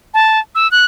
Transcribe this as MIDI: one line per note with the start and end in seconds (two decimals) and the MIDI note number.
0.14 0.39 81
0.55 0.70 88
0.71 0.85 90